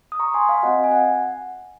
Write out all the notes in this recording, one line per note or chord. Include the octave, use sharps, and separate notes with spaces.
D#6
A#5 C#6
G#5 C6
F5 G#5
C4 F#4 D#5 F#5
G#5
F#5